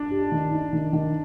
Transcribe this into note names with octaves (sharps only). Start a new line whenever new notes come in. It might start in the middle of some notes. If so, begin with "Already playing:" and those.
Already playing: D4
G4
D#3
D#4
D#3
D#3